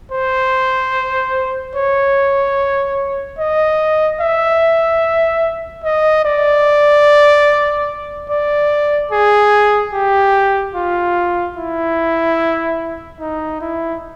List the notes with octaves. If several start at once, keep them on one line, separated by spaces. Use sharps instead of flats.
C5
C#5
D#5
E5
D#5
D5
D5
G#4
G4
F4
E4
D#4
E4